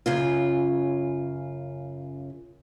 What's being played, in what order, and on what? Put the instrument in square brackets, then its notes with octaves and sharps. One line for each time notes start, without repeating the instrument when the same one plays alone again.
[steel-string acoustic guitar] F#2 C#3 F4